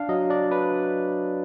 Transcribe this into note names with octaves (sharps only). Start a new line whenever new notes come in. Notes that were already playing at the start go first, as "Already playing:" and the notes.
Already playing: D4 F5
F#3 D#5
D4 D5
D4 B4